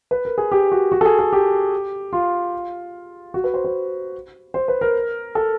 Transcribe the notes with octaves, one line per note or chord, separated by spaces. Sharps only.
B4
A#4
G#4
G4
F#4
F#4
A4
G#4
A4
G4
F4
F#4
B4
C5
C5
C5
B4
A#4
A4